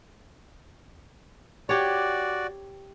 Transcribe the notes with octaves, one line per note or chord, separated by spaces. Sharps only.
F#4 G4 C#5 D5